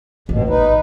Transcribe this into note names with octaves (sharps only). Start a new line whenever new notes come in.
A1 D#2 B2
D#4 B4